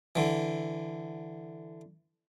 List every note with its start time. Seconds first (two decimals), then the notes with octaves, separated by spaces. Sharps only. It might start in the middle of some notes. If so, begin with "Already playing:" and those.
0.16 D3 E3